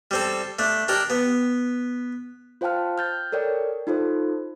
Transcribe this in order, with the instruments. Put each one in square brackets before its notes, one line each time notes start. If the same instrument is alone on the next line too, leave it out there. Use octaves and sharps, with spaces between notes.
[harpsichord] G3 C4 A4
A3 D4
D4 G4 A#4 D5
B3
[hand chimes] F4 C5 F5 G5 A5 F6
F6 G6 A6
A4 A#4 C#5 D5 G5
D#4 F4 A4 C5